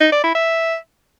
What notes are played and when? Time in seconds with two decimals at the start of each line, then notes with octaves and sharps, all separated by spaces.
0.01 D#4
0.12 D5
0.24 E4
0.35 E5